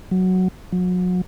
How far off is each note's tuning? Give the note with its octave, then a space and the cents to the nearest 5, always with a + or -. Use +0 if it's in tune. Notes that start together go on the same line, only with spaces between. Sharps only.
F#3 +0
F#3 -35